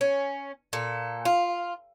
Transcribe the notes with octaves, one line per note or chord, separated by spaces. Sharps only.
C#4
A#2 A4
F4